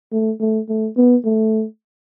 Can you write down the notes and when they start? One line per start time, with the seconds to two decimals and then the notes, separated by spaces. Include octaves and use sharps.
0.12 A3
0.40 A3
0.69 A3
0.97 B3
1.25 A3